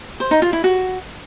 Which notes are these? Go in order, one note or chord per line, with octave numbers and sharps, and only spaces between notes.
C5
D#4
F4
E4
F#4